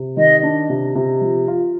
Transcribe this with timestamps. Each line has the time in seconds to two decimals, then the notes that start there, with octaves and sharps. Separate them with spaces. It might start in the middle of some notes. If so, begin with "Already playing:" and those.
Already playing: C3
0.17 D#3 D#5
0.43 D4
0.69 C3
0.95 C3
1.21 F3
1.48 F4